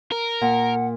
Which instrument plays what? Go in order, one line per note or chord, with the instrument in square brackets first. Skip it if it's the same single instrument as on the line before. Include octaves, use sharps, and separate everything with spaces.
[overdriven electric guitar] A#4
[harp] A#2 [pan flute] F#5